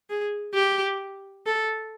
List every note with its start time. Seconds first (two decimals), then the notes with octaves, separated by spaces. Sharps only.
0.10 G#4
0.54 G4
1.46 A4